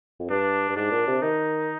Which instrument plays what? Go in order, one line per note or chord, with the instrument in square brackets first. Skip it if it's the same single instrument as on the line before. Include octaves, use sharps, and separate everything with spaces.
[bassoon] F2
[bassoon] G2 [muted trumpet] D4
[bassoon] G2
[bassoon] G#2 [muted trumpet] D4
[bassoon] A#2
C3
[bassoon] D#3 [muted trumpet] D#4